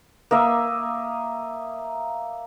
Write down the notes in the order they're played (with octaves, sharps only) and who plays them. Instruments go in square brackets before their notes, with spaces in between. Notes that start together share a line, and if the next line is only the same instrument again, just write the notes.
[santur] A#3 D#5 E5